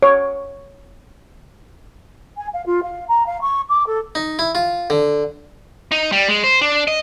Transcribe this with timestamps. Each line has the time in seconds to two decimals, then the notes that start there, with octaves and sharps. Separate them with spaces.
0.03 C#5
2.37 G#5
2.53 F5
2.66 F4
2.83 F5
3.08 A#5
3.26 F5
3.41 C#6
3.69 D6
3.86 A4
4.15 D#4
4.39 E4
4.55 F4
4.90 D3
5.92 D#4
6.12 G3
6.29 G#3
6.44 C5
6.61 D4
6.88 D#5